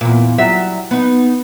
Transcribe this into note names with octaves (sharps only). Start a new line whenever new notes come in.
E2 A#2
F#3 G3 E5
B3 D#4